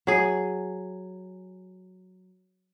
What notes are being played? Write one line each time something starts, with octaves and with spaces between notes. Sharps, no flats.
F#3 G#4